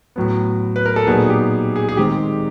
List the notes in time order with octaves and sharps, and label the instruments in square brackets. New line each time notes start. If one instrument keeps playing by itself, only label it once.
[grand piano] A2 F#3 B3
B4
A#4
A4
A#2 F#3 B3 D#4 G#4
G4
G#4
G#4
D#3 G#3 C4 G4